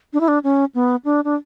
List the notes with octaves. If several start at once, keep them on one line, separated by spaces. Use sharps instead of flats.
D4
E4
D4
C#4
B3
D4
D4